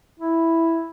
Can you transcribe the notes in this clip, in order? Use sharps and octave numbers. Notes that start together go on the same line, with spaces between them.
E4